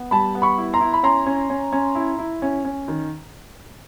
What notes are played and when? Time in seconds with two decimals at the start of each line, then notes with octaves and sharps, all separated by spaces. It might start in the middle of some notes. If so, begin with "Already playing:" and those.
Already playing: B3
0.11 G3 A5 B5
0.35 B3
0.42 B5 C#6
0.58 E4
0.73 A#5 C6
0.80 E4
0.94 B5
1.03 C#4 A#5 C6
1.26 C#4
1.50 C#4
1.72 C#4
1.95 E4
2.18 E4
2.42 C#4
2.65 C#4
2.88 D#3